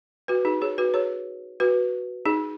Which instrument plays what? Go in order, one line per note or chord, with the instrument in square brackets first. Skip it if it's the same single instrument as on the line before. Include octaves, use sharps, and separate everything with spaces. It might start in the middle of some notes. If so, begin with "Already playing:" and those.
[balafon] F#4 B4
D#4 G#4
G#4 C#5
F#4 B4
G#4 C#5
F#4 B4
D#4 G#4